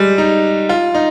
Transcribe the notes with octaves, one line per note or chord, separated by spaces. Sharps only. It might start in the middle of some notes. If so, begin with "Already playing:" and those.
Already playing: G3 G#3
D#4
F4
D#4